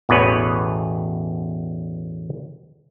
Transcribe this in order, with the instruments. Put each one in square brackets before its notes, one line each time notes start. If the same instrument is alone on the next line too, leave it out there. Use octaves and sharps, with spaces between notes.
[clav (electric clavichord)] A1 E2 B2 B4 C#5